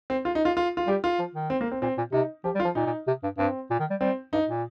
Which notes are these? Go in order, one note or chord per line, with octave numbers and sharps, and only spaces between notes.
C4
F4
D#4
F4
F4
F4
G3 G4
F4
F3
D#3
C4
A#3
C4
A#2 C4
A#2
C3 D#4
F3 G4
G3
F4
F3
A#2 D#4
A#2
C3
G2
G2 C4
A#2
D#3
G3
G3 C4
G2 D#4
A#2